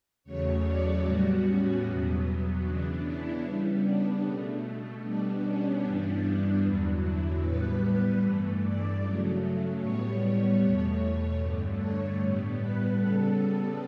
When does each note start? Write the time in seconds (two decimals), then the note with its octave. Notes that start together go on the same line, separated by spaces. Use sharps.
0.24 E2 C#3 F#3 A3 C#5
0.64 D5
1.03 A2 G3 B3 F#4
1.43 C#4
1.84 E2 B2 F#3 B3
2.63 C#3 E3 B3 D4
3.03 E4
3.42 C#3 G3 B3
3.83 D4
4.22 B2 A3
5.01 B2 G3 B3 D4
5.41 C#4
5.81 G2 E3 G3 B3 D4
6.61 E2 D3 F#3
7.01 E4
7.40 A2 G3 B3 B4
8.20 G2 E3 A3
8.60 D5
8.99 C#3 F#3 A3
9.79 A2 G3 B3 C#5
10.19 C#5
10.59 E2 B2 A3 C#5
10.98 C#5
11.39 G2 D3 A3
11.78 C#5
12.18 A2 G3 B3
12.57 B4
12.97 C#3 G3 B3 A4